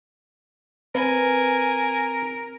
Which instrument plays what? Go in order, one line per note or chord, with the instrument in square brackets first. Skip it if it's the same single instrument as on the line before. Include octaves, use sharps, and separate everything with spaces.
[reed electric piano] C4 [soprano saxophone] A#4 [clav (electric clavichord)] B4 [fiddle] G#5